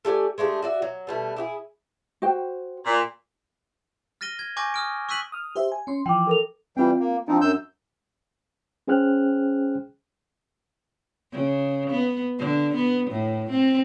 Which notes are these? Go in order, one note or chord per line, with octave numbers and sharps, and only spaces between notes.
A3 G4 D5 G#5
G#3 A3 D4 G4
F#4 D5 E5
F#3
B2 G3 A3
E4 G4 G#4
F#4 C5 G5
A#2
F6 A6 A#6 D#7 G7
G#6
G#5 C#6 D6 G6 A#6
D#6 F6 D7
C#6 E6 F#6 B6 D#7 F#7
D#6 F6
G4 C5 E5
G#5
C#4 C6
E3 F3 G5 D6
A4 A#4 F7
E3 G3 C4 F4 G5
A#3
F3 C4 D4 D#4
F#2 E6 G6
C#4 G#4 C5 G5 F6 F#6
C#3
B3
D3
B3
A2
C4